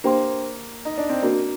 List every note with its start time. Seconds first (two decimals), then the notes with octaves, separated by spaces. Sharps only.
0.04 A#3 D4 G4 C5 G5 C6
0.85 D#4
0.98 D4
1.10 C4
1.23 A#3 D4 F#4 A#4